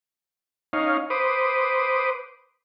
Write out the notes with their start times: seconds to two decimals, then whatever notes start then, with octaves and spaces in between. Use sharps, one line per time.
0.73 C#4 D#4 F5
1.10 B4 C5 D6 D#6